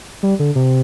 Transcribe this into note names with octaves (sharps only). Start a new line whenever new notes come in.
G3
D3
C3